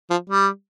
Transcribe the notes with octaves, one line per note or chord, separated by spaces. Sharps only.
F3
G3